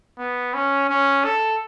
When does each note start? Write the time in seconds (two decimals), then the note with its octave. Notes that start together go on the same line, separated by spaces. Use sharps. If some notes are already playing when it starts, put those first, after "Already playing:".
0.18 B3
0.54 C#4
0.90 C#4
1.25 A4